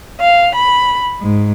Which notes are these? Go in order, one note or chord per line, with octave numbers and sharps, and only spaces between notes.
F5
B5
G#2